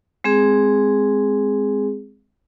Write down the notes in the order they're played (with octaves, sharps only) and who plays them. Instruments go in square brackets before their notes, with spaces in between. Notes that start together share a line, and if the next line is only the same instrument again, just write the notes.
[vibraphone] G#3 C4 G#4